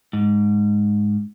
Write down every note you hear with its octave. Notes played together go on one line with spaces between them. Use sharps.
G#2